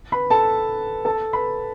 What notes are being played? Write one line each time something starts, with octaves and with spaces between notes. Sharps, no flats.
B4 B5
A4 A5
A4 A5
B4 B5